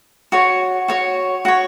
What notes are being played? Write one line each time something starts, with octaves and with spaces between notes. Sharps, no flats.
F#4 C#5
F#4 C#5
F#4 C#5